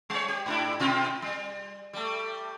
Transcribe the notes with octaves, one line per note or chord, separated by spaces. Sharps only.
G3 C#5
G4
G#2 D4 E4
B2 F4
G3
G3 A3